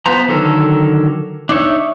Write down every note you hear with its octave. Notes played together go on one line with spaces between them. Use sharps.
B3 F4 C5 A#5
D3 D#3 F#3 A4 A#4
D4 D#4 C#5 E5